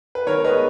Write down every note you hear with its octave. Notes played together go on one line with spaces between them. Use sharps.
B4
D#3 A#4 C#5
G#3 B3 B4 D#5